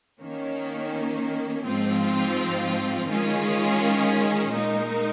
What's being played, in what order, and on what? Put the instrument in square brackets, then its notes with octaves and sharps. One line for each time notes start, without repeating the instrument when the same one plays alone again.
[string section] D#3 A#3 C#4
G#2 F3 C4 F4
D#3 G#3 C#4 F4 G#4
A#2 G#3 D#4 A#4